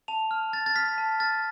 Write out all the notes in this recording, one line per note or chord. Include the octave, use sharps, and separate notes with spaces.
A5 F7
F6
A5 A6
A6
F6 B6
A5
F6 A6